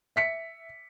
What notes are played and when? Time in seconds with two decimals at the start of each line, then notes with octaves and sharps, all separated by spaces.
0.16 E5 B6 C#7